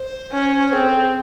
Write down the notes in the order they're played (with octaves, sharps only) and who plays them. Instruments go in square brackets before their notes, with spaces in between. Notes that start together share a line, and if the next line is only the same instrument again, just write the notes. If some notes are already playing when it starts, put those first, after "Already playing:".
Already playing: [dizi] C5
[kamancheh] C#4
[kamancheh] C4 [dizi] G#4
[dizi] A4
G#4